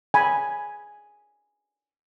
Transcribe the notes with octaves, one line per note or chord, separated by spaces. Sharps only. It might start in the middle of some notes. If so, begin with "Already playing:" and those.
G#5 B5